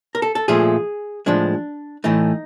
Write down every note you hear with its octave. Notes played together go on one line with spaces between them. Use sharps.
A#4
A4
A4
A#2 F3 A3 G#4
A2 F3 G#3 D4
A2 E3 A3 D#4